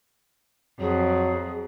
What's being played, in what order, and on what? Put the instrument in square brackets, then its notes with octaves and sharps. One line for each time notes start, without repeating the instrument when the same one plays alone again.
[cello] F2 [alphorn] F#3 [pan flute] G#4